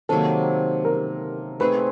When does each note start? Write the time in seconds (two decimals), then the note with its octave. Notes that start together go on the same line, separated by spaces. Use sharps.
0.09 C3 D#3 F#3 A#3 A4
0.85 A#4
1.60 A3 C4 D#4 G#4 B4